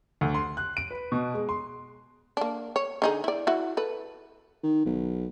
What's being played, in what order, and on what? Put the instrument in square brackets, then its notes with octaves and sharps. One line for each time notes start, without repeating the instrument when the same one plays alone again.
[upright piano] D2
C6
F#6
D7
B4
B2
G#3
C6
[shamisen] A#3 D4
C#5
D3 D#4 G#4
E4 D5
E4 F#4
A4 B4
[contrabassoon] D#3
B1